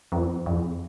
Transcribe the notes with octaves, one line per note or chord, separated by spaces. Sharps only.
F2
F2